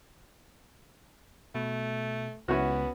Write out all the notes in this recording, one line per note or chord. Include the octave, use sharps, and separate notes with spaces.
B2 A3
C#2 B3 C#4 E4 F#4